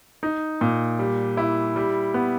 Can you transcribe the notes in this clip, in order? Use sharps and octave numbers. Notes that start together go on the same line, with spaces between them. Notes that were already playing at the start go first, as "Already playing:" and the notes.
D#4
A#2
G3
E4
G3
B3